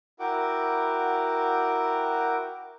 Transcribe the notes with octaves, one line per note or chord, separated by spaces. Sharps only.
E4 F#4 A#4 F#5 G5 D6